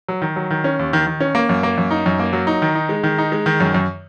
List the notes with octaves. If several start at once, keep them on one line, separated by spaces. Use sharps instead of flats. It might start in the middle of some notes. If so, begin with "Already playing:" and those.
F#3
D#3
F#3
D#3
C#4
D#2
D#3
D#3
C#4
A#3
F#2
A#3
F#2
D#4
F#2
A#3
F#3
D#4
D#3
D#4
G#3
D#3
D#4
G#3
D#3
F#2
F#2